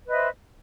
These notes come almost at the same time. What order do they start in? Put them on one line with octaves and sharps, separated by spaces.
B4 D#5 E5 C5